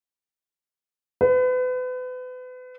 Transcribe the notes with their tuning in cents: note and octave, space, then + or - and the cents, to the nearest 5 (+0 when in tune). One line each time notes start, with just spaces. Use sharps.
B4 +35